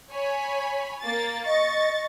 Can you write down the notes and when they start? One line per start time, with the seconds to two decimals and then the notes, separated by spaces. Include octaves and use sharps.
0.12 C#5 G#5 B5
1.02 A#3 A6
1.46 D#5 C#6 A6